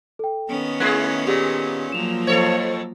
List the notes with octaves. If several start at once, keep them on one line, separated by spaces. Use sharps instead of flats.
A4 G5
D#3 B3 C#4
A3 E4 G#4 F#6 G#6 B6
A#2 G4
F3 F#3 A#3 E7 F7
F2 A4 C5 C#5